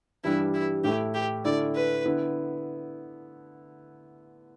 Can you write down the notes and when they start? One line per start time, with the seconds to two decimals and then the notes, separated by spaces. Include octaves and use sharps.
0.24 G2 E3 G3 D4 E4
0.54 E4
0.84 A2 A3 E4 G4
1.14 G4
1.45 D3 A3 E4 D5
1.75 B4
2.05 D3 B3 E4